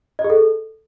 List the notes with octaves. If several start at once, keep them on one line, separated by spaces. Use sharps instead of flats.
D#5
G#4
A4